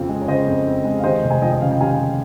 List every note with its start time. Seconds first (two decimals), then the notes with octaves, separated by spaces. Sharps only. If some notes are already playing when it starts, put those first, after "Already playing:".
Already playing: F2 C#3 C4 F4
0.09 G#3
0.22 C#5
0.28 C#3 C5 D#5
0.47 F2
0.66 C4
0.85 G#3
0.99 F5
1.04 D#2 C5 D#5
1.24 F1
1.31 G#5
1.42 F3 D#5 G5
1.52 D#5
1.61 C#3 F5
1.71 G5
1.80 D#2 F5 G#5